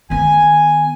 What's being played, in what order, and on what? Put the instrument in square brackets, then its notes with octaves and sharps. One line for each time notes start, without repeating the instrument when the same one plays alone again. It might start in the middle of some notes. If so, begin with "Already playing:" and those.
[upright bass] D#3 B3 [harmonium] G#5